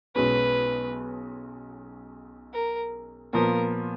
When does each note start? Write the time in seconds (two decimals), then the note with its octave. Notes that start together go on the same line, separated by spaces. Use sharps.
0.15 B1 B2 G#3 C#4 B4
2.54 A#4
3.33 A#2 F3 B3 A#4